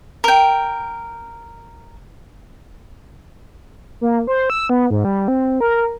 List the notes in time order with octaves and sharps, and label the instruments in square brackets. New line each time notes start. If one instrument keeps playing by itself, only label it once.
[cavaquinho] A#4 G5
[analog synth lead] A#3
C5
E6
B3
G#2
G3
C4
A#4